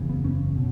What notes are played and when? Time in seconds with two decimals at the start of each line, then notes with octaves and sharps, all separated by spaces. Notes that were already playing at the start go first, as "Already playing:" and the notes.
Already playing: F#1 E2 C#3
0.09 B3
0.25 C#4
0.57 B2